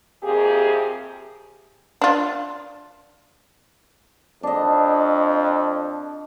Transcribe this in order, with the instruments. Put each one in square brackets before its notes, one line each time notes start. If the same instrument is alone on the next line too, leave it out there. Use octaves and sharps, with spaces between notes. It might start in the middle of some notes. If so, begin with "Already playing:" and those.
[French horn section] F2 C3 A#3 G4 G#4
[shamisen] D4 F4
[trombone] F2 [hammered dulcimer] D4 D#5